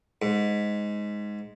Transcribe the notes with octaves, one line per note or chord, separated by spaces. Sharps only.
G#2